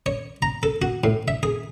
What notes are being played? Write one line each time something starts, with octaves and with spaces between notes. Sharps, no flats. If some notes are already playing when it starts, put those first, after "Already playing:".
C#5
A#5
A4
F#4
A2
E5
G#4